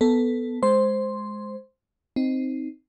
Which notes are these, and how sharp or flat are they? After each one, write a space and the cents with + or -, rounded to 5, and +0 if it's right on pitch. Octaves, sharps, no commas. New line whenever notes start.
B3 +0 A4 +0
G#3 +5 C5 +0 C6 +0
C4 -5 D#4 +0